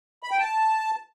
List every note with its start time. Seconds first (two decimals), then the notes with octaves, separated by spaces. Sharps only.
0.23 B5
0.31 G5
0.39 A5